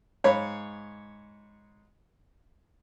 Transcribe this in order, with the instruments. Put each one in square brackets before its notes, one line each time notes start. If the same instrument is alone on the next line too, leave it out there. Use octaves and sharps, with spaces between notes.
[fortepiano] G#2 C#5 F5 B5